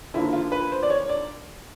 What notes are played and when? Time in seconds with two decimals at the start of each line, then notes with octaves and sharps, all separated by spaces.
0.14 D#2 D3 F3 A#3 E4
0.33 F4
0.52 B4
0.72 C5
0.83 D5
0.90 C#5
1.09 D5